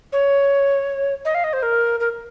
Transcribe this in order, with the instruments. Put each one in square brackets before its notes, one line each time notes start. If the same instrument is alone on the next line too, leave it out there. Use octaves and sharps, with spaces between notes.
[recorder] C#5
D#5
F5
D#5
C5
A#4
A#4